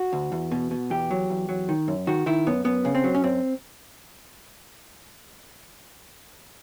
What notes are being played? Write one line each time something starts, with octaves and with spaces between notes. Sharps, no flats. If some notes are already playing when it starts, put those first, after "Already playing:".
Already playing: F#4
D2
E2
B2
B2
E2 G4
F#3
E2
F#3
D#3
F#2
D#3 F#4
D#3 E4
F#2 B3
F#2 B3
C#3
C4
F#3
C#4
F#2 C4